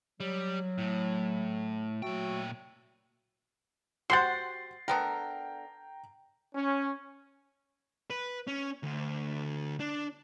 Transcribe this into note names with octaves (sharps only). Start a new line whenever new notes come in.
F#3 G3
A2
A#2 F#3 A3 F#4 G5
F#4 G4 C5 F#5 C6 A6 C7
D3 B3 A#4 G5 A#5
C#4
B4
C#4
D2
D4